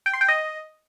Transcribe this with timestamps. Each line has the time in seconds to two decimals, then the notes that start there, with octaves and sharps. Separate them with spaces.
0.06 G5
0.13 C6
0.21 G5
0.28 D#5